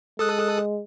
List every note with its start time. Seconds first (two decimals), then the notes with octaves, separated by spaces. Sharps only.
0.19 G#3 A4 D#6 F#6